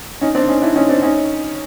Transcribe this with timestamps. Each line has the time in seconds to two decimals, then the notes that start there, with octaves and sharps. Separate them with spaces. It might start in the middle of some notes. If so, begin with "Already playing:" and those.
0.21 C#4 D#4
0.35 C4 D4
0.48 C#4 D#4
0.62 D4 E4
0.76 C#4 D#4
0.89 C4 D4
1.02 C#4 D#4